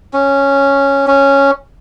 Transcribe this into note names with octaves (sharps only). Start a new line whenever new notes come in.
C#4
C#4